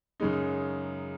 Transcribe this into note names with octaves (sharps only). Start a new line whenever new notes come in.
F#2 C#3 G#3 D#4